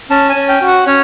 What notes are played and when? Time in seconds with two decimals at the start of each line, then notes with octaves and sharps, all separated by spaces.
0.10 C#4 A5
0.29 G#5
0.36 C#4
0.49 G5
0.61 F#4
0.68 F#5
0.87 C#4 C#5